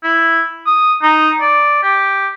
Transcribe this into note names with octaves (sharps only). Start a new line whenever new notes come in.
E4
D#6
D#4
D5
G4